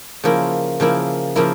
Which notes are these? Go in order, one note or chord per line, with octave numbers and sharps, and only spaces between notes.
C#3 F3 A#3 E4
C#3 F3 A#3 E4
C#3 F3 A#3 E4